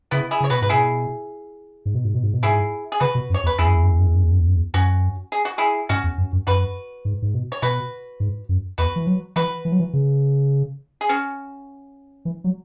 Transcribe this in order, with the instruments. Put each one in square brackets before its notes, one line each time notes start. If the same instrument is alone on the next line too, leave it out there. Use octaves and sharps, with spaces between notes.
[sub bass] C#3 [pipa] B3 E4
[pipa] E4 G#4
[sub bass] C#3 [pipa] C#5
[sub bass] B2 [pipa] F#4 B4
[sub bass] G#2 [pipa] B4
[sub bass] B2 [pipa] E4 G#4
[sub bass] G#2
B2
G#2
B2
G#2
B2
[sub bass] G#2 [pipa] E4 G#4
[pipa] G#4
[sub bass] C#3 [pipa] F#4 B4
[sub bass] B2
F#2
[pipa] C#5
[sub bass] E2
[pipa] B4
[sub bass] E2 [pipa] E4 G#4
[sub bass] F#2
E2
F#2
E2
F#2
E2
F#2
E2
F#2
E2
F#2
E2
[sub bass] F#2 [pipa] C#4 F#4
[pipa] G#4
F#4
E4 G#4
[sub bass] G#2 [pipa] C#4 F#4
[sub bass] E2
F#2
F#2
[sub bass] F#2 [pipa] F#4 B4
[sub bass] G#2
G#2
B2
[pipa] C#5
[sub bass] B2 [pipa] F#4 B4
[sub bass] G#2
F#2
[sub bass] E2 [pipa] F#4 B4
[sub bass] E3
F#3
[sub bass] E3 [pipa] F#4 B4
[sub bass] E3
F#3
E3
C#3
[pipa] G#4
C#4 F#4
[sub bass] E3
F#3